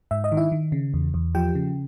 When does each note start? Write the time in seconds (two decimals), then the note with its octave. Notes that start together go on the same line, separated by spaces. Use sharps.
0.11 G#2 E5
0.24 D#5
0.32 D#3
0.37 E4 E5
0.52 D#3
0.72 C#3
0.94 E2
1.14 E2
1.35 F3 G4 G5
1.55 C#3